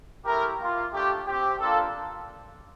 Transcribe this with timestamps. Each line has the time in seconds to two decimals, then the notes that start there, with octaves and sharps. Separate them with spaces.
0.24 A3 E4 G4 A#4
0.59 A#3 F4
0.92 A3 D4 F4 G4
1.27 C4 G4
1.59 A#3 D4 F4 A4